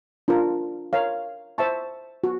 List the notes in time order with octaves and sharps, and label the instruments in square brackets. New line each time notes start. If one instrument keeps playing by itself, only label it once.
[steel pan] D4 F4 A#4
A#4 C#5 F5
C5 E5 A5 C#6
F#4